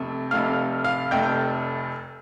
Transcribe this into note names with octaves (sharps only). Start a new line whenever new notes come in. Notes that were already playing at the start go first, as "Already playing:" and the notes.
Already playing: F1 F2 C3 A3
F1 F2 C3 A3 F5 F6
F5 F6
F1 F2 C3 A3 G5 G6